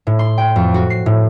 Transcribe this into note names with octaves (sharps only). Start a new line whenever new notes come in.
A2
C6
G5
F2
F#4
C7
A2